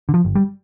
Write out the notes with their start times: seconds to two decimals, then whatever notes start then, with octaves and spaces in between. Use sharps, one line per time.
0.09 D3
0.14 F3
0.25 G1
0.35 G3